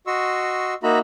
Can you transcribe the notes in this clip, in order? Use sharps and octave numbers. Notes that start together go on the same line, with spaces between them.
F#4 D#5 C6 C#6 E6
A#3 D#4 F#4 E5 A#5 B5